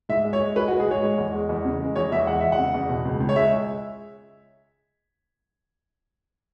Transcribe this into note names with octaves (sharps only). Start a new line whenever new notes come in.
G#2 E5
G#3
C#5
G#3
G#3 B4
F#4
G#3
G#4
G#2 C#5
G#3
E2
G#3
E2
C#3
G#3
E2 C#5
E2 E5
G#3 F#5
E2 E5
F#5
C#3
E2
B2
C#2
C#2
C#5
G#3 E5